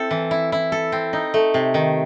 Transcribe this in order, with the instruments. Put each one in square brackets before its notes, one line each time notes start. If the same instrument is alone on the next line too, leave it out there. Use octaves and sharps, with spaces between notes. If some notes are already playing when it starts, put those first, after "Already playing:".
Already playing: [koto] C4 E4 A4
E3
E4
E4
A4
C4
D#4
A3
C3
D#3